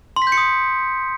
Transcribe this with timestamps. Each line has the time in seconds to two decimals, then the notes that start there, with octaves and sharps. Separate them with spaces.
0.16 C6
0.22 B6
0.27 G6
0.32 C#7
0.37 D#6